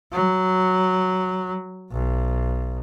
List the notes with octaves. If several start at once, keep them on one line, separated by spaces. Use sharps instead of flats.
F#3
B1